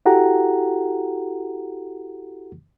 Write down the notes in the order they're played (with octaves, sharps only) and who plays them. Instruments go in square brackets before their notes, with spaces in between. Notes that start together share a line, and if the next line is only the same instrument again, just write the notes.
[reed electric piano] E4 F#4 G4 A4 F#5 A#5